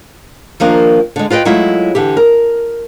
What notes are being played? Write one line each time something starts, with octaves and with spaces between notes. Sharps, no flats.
D#3 F3 A#3 D4
D3 G#3
F4 B4 D#5 G5
F#3 G#3 A3 E4 F4
D3 E3 G4
A#4